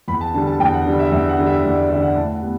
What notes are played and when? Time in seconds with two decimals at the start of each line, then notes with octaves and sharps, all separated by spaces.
0.08 E2 B5
0.21 A5
0.34 D3 G3 A5
0.47 A5
0.60 E2 G5
0.74 F#5
0.86 D3 G3
0.99 E5
1.12 E2 E5
1.29 F#5
1.38 D3 G3
1.46 E5
1.64 E2 D5
1.78 D5
1.90 G3 E5
1.94 D3
2.03 F#5
2.16 A2 A5
2.33 F#5
2.42 G3 B3